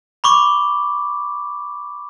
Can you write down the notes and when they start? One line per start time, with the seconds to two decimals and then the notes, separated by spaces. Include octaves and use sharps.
0.24 B5 C#6 D6